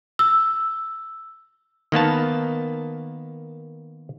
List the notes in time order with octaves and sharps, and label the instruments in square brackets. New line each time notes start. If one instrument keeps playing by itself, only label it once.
[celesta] E6
[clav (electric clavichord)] D#3 A#3 B3 A5